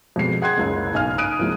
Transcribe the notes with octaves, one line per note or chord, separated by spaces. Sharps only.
F2 B2 G#3 C7
G#4 F#5 G5 C6 F#6 G#6
F#1 C#2 C#3
B1 G#5 F6
D#6 F#6 D7 D#7
C2 F3 G#3